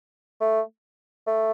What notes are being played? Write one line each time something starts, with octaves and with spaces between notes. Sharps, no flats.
A3
A3